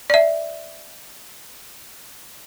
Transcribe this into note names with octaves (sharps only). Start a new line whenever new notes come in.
D5 E5